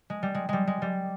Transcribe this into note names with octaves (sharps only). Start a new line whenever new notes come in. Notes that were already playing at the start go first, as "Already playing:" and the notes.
G#3
G3
G#3
G3 G#3
G#3
G3